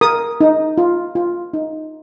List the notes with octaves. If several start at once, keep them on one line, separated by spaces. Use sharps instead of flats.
A#4 D#6
D#4
F4
F4
D#4